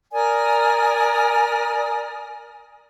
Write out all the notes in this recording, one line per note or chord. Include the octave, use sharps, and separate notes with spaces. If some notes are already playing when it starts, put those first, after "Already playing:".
A#4 D5 G#5 D#6